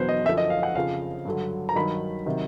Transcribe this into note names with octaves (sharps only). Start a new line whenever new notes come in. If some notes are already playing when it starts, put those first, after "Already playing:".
Already playing: E2 B2 F#3 B4 C5
D#5
F#2 D3 F3 E5
D#5
F5
F#5
F2 C#3 F3 F5
G2 D3 F#3
A#5
G2 D#3 F#3 B5
C3 D#3 F#3